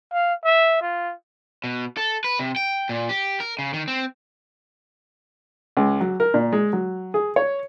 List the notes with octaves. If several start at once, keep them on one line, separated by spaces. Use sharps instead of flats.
F5
E5
F4
B2
A4
B4
C3
G5
A#2
G4
A#4
C#3
D#3
C4
C#2
F#3
A#4
A#2
G#3
F#3
G#4
C#5